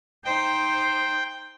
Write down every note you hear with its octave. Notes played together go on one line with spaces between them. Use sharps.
D#4 C5 G5